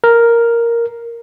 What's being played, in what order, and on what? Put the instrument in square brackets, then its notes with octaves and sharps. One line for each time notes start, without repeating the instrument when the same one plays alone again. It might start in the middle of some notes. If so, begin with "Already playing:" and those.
[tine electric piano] A#4